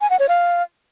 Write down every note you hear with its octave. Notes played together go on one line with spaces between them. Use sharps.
G#5
F#5
C#5
F5